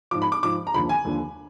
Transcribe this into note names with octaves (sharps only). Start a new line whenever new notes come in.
G#2 F3 D6
B5
D6
G#2 F3 D6
A#5
D#2 D3 F3 B5
G#5
D#2 D3 F3